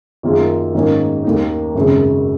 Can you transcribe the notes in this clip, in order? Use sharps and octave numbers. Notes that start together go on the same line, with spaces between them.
F#2 D#3 A#3 F4 G#4
G#2 D#3 A#3 C#4
D#2 D#3 A#3 D#4
G#1 F#2 C#3 G#3